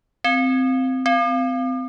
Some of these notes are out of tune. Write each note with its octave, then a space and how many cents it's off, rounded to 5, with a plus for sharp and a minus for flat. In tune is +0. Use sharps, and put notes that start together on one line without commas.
C4 -10
C4 -30